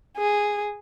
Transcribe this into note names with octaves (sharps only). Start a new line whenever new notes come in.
G#4